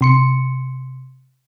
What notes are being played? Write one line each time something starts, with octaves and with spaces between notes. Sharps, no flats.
C3 C6 C#7